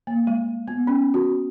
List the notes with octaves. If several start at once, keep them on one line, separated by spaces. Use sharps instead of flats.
A#3
G#3
B3
C#4
F#4